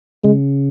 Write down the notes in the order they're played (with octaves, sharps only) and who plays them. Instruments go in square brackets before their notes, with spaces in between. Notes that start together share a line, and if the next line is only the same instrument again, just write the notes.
[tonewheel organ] C#3 [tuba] G#3